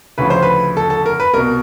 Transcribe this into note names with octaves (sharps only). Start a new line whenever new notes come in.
D2 C#3 F3 B4
C5
B4
A4
A4
A#4
B4
C2 B2 A#4